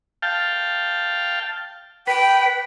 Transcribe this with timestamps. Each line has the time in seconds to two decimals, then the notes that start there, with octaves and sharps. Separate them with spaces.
0.22 F5 G5 A5
2.07 B4 G5